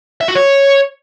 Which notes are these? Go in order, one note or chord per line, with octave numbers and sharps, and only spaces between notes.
E5
F#4
C#5